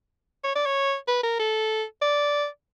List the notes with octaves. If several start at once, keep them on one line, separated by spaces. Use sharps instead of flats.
C#5
D5
C#5
B4
A#4
A4
D5